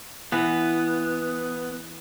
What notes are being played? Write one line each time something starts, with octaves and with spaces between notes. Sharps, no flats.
E3 B3